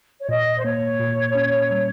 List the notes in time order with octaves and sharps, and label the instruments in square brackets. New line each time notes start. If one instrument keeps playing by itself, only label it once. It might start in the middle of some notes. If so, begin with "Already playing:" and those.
[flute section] C#5
[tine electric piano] A#2 [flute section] D#5
[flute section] C5
[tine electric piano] A#3 [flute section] C#5
[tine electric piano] A#2
C#4
G3